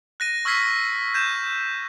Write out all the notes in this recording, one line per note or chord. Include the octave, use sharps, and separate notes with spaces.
F#6 A#6 D#7
C#6 E6 F6 G#6 B6 C7
G6 G#6 D#7 E7